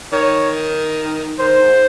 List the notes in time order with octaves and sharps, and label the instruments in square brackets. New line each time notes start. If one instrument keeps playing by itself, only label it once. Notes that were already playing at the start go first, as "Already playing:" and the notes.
[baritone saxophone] D#3 [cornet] C#5
[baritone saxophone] D#3 [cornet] C5
[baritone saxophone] G#2